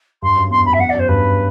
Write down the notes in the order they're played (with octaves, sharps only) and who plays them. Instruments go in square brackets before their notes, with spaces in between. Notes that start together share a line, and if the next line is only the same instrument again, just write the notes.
[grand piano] G2 [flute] C6
[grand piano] F#2
[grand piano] E2 [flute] C6
[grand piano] F#2 [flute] B5
[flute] E5
[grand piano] E2 [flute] F#5
[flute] D5
[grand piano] F#2 [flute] C5
[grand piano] G2 [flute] B4